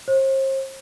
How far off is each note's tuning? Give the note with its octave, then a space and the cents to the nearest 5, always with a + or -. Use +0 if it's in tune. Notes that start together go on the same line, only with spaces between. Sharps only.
C5 +40